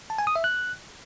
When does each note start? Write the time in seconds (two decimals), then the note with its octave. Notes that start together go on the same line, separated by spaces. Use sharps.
0.10 A5
0.19 G#5
0.27 D#6
0.36 E5
0.44 F#6